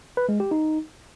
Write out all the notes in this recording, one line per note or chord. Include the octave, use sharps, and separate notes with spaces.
B4
G#3
G4
D#4